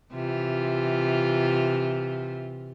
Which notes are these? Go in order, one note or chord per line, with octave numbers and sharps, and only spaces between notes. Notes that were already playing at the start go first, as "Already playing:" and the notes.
C3 E3 F4